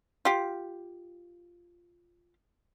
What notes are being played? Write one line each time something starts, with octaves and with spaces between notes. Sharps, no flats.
F4 G4